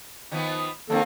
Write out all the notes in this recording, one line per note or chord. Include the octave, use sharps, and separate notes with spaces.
D#3 F3 B3
D#3 F3 A#3 C4 C#4 A4